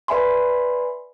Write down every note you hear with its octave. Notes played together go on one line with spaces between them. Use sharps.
B4 D5 E5 G#5 B5 C6